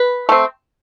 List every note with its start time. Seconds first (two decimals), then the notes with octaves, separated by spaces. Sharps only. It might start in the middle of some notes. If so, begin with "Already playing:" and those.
Already playing: B4
0.29 A3 C4